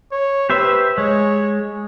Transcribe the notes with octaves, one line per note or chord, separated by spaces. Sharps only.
C#5
G4 B4 C5 E5
G#3 C#5